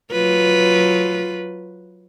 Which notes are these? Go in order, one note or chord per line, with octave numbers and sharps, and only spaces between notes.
F#3 F4 B4